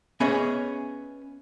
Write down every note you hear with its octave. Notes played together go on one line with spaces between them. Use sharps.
B3 C#4 G#4 C#5 D#5 E5